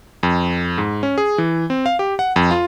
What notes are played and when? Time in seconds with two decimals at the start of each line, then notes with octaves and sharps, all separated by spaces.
0.23 F2
0.78 G#2
1.03 C#4
1.18 G#4
1.38 E3
1.70 C4
1.86 F5
1.99 G4
2.19 F#5
2.36 F2
2.51 F4